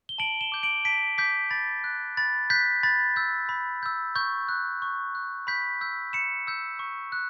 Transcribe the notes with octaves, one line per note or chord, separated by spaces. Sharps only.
G7
A5 D7 F#7
E7 G7
D6 G6
D7 F#7
A5 B6 D7
D6 G6 B6
B5 A6
F#6
B5 A6
F#6 G6 B6
B5 A6
E6 G6
B5
E6 G6
C#6 G6
F#6
C#6
F#6
B5 G6 B6
E6 G6
B5 C#7 E7
E6 G6
C#6
F#6